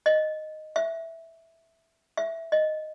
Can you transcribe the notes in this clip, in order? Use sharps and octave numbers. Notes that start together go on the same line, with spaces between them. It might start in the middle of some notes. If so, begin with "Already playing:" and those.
D#5
E5
E5
D#5